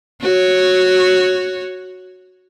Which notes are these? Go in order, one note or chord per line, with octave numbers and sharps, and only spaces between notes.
F#4 C#5